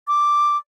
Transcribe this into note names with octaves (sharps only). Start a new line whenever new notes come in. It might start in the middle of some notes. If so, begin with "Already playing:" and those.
D6